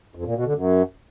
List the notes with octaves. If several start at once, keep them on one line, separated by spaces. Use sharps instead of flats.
F2
A#2
B2
D3
F#2